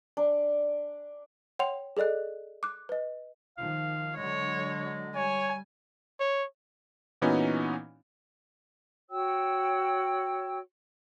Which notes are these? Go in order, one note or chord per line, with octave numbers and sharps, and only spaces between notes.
D4
C#5 F#5 G5 C6 F7
G#4 A4 D5 D#5 F#6
D6 F#6
B4 D#5
D#3 F3 F5
D3 F#3 G#3 C#5
G3 C#5 G#5
C#5
A#2 E3 B3 C#4 D#4 F#4
F#4 C#5 G5 E6